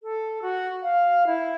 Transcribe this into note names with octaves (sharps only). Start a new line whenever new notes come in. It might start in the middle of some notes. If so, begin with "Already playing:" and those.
A4
F#4
F5
E4